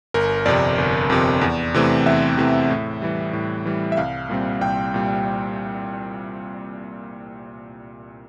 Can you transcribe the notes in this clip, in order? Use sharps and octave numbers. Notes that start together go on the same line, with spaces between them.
G1 A#4
F2 C3 D5
G1
F2 C3
E2
C3 E3 A3 C4
E2 E5
C3 E3 A3 C4
A2
E3 G3
A2
E3 G3
E5
C2 F5
A#2 G3 C4
C2 G5
A#2 G3